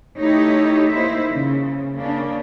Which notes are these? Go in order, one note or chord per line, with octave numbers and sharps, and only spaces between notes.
A3 D#4 E4 G4 C#5
A#3 D#4 E4 C5 E5
C#3
C#3 A#3 C#4 D4